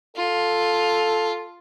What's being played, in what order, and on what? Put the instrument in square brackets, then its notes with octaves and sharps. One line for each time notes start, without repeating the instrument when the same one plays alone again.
[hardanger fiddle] F4 [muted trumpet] A4